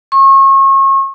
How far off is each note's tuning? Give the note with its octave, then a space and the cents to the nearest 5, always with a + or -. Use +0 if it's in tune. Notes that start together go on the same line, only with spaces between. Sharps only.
C#6 -35